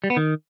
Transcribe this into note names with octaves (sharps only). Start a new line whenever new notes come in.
G3
B3
D#3